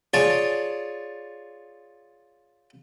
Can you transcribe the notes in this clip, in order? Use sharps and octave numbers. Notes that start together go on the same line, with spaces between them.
F4 G#4 C#5 D5 G#5 A5